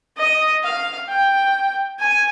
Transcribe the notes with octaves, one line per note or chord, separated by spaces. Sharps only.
D#5
F5
G5
G#5